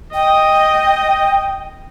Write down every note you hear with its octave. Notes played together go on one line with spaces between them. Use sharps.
D#5 G5